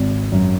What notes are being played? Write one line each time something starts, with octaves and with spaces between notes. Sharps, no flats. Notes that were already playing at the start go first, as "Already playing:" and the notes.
Already playing: G#1
F#2